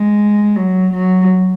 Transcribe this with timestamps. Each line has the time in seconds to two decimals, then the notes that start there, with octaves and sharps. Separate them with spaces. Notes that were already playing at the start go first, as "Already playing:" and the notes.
Already playing: G#3
0.56 F#3
0.93 F#3